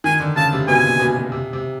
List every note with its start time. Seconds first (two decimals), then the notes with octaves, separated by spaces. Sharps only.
0.04 D#3 G#5
0.20 D3
0.36 C#3 A5
0.53 C3
0.68 B2 G#5
0.84 A#2
1.00 B2
1.16 B2
1.32 C3
1.53 C3